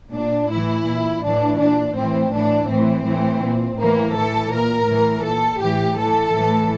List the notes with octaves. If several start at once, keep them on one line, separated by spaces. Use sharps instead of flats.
A#2 D4
A2 E3 E4
A#2
A2 E3 D4
A#2 D4
A2 E3 C4
A2 E3 D4
A2 E3 C4
A2 E3
A#2
A2 E3 A#3
A2 E3 A4
A#2 A#4
A2 E3
A#2 A4
A2 E3 G4
A2 E3 A4
A2 E3